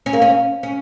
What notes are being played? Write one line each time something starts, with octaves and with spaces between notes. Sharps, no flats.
C#4
A#3
C#4
C#4